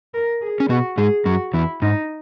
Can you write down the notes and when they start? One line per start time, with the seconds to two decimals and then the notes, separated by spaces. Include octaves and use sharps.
0.14 A#4
0.41 G#4
0.60 C#4
0.69 B2 B3 F#4
0.97 G#2 G#3 G#4
1.25 F#2 F#3 F#4
1.53 E2 E3 E4
1.82 G#2 D#4